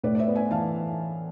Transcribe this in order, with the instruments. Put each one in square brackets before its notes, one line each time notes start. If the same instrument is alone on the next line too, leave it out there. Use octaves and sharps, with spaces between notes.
[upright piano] A2 [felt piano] B4 D5
[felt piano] D5
C5 E5
[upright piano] B3
[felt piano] E5 G#5
[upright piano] E3 [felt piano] F5 A5